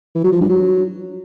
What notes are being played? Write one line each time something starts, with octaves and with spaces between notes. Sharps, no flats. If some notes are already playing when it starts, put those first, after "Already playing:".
E3
F#3
F3
G2
F#3